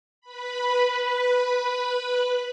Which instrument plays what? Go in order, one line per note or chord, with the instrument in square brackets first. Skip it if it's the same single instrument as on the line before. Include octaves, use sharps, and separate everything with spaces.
[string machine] B4 B5